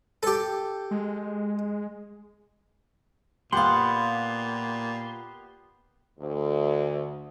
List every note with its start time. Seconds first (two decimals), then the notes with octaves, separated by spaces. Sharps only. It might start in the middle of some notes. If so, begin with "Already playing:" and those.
0.23 G4 A4
0.91 G#3
3.52 A#2 B3 G4 F5 F#5 C6
6.19 D2